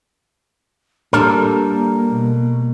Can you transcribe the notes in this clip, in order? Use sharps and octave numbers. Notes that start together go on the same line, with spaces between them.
G3 A#3 D4 A4 A#4
B2